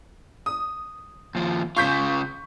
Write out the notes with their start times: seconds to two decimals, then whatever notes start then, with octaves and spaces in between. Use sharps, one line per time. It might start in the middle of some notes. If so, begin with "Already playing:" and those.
0.46 D#6
1.35 D#2 F3
1.77 C#3 F4 C#6 G6 B6